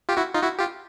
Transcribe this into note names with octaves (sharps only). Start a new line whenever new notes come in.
F4 G4
E4 F#4
D#4 F4
E4 F#4
F4 G4